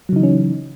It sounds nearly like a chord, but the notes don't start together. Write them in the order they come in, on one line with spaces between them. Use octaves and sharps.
F#3 C#3 D#4 E3 C#4